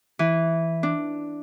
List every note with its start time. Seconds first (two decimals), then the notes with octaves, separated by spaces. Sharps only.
0.19 E3
0.83 D4